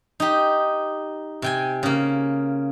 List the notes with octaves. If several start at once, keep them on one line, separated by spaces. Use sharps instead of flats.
D#4 G4
C3 G5 G#5
C#3 A#3